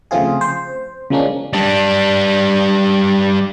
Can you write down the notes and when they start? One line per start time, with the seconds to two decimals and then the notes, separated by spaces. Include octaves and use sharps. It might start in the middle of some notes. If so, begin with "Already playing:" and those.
0.11 C#3 F3 A3 C4 F4 G#4
0.41 C5
1.10 C#3 F3 G#3 A#3 C#4 D4
1.53 G3 D4